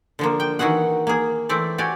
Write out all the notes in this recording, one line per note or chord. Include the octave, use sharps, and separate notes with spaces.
D3 F3 A#3
G5
D#3 E3 F#4 G#4 F#5
A#3 G#4
E3 A3 C4 D5
F#4 G4 D5 G#5